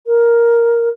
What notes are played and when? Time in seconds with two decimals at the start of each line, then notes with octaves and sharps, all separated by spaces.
0.06 A#4